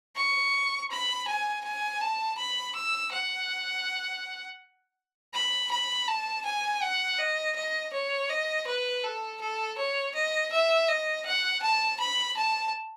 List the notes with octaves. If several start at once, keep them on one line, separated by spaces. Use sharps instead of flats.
C#6
B5
G#5
G#5
A5
B5
E6
F#5
B5
B5
A5
G#5
F#5
D#5
D#5
C#5
D#5
B4
A4
A4
C#5
D#5
E5
D#5
F#5
A5
B5
A5